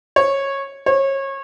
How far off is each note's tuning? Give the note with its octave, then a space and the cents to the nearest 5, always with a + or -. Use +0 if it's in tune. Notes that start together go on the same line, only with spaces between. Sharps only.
C#5 -15
C#5 -30